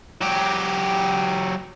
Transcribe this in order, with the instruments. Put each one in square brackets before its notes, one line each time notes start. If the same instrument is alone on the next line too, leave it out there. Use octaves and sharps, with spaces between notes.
[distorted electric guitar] F#3 G4